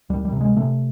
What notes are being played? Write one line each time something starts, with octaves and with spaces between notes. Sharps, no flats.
D2 G3
G3
C3
G#3
C3 A3